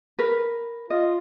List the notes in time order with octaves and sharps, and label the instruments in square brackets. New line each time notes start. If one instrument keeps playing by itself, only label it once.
[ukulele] A#4 B4
[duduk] F4 [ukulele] D#5